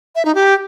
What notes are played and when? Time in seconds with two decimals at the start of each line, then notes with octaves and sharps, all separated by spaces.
0.16 E5
0.25 D#4
0.35 G4